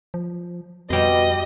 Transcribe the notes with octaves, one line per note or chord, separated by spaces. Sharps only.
F3
F2 B2 G3 D#5 C6